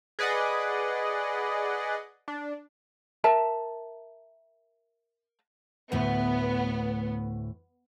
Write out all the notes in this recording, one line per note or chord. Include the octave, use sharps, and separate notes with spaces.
G#4 B4 D5 D#5 F#5
D4
A#4 E5 A5
D2 A2 B3